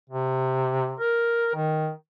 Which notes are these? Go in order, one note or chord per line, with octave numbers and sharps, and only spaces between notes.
C3
A#4
D#3